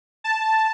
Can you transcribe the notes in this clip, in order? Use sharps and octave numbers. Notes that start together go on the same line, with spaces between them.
A5